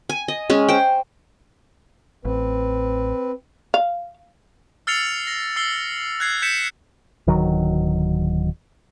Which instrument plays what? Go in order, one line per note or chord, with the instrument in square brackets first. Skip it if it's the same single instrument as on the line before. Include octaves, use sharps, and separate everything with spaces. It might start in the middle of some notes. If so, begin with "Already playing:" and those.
[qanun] G#5
D#5
G#3 C#4
C5 G5
[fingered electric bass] A1 [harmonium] C4 B4
[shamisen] F5
[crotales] E6 F6 A6 C7 C#7 F7
A#6
E6 C7 G7
F#6 G#6 C7
G6 B6 C#7 E7
[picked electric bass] D1 D#3 F#3